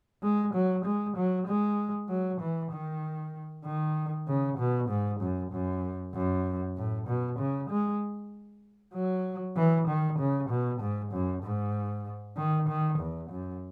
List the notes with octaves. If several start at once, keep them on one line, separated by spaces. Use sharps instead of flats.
G#3
F#3
G#3
F#3
G#3
F#3
E3
D#3
D#3
C#3
B2
G#2
F#2
F#2
F#2
A2
B2
C#3
G#3
F#3
E3
D#3
C#3
B2
G#2
F#2
G#2
D#3
D#3
E2
F#2